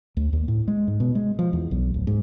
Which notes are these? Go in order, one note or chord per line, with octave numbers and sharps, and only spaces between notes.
D2
D#2
A2
G#3
G#2
B2
G#3
F3
E2
B1
D1
G#2